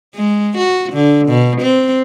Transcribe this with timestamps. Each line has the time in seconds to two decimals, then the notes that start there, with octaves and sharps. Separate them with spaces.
0.15 G#3
0.57 F#4
0.93 D3
1.28 B2
1.61 C4